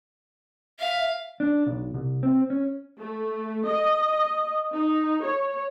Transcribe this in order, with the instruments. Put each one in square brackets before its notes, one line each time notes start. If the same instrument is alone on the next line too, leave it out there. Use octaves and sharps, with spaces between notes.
[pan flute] E5 [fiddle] F5
[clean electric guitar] D4
B1
C2
C4
C#4
[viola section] A3
D#5
D#4
C#5